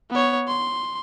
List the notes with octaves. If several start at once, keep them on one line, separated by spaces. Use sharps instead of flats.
B3 C#5
C6